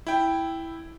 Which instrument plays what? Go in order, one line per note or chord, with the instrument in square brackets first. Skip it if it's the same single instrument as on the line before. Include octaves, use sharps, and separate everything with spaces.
[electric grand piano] E4 G5